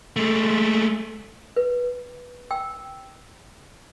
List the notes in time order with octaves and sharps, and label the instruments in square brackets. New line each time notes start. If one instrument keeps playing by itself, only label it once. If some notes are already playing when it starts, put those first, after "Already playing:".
[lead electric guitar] G#3 A3
[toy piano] B4
G5 E6